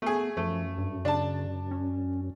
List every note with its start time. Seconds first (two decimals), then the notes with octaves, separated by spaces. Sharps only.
0.02 A3 B3 G#4
0.37 F#2 F3 A3
0.78 G2
1.05 C#3 D4 A5
1.71 C#4